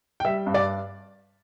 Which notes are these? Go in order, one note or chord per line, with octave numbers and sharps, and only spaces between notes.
G5
G3 E5
G2
D5